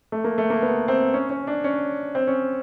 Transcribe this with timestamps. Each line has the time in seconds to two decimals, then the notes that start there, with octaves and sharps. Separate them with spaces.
0.12 A3
0.24 A#3
0.38 A3
0.50 A#3
0.62 B3
0.88 C4
1.14 C#4
1.30 C#4
1.47 D4
1.64 C#4
2.15 C4
2.27 C#4